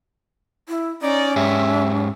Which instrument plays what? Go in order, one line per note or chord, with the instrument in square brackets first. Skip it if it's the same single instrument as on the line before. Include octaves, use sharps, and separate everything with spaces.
[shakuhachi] E4
[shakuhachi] C#4 [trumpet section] D#4 D5
[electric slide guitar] G#2 G4 [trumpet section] E5